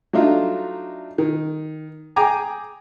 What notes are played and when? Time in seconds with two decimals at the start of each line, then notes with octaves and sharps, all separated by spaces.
0.13 F#3 A3 D4 D#4 F4
1.18 D#3
2.16 G#4 G5 G#5 A#5 D6